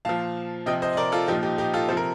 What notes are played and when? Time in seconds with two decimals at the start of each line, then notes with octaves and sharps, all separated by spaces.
0.05 A#2 F3 F5 A5
0.66 C3 F3 D#5 G5
0.82 C5 D#5
0.93 D#5
0.97 A#4 D5
1.12 F4 A4
1.28 F3 D#4 G4
1.32 A#2
1.43 D#4 G4
1.58 D#4 G4
1.73 F4 A4
1.89 C3 F3 A4 C5
1.97 A#4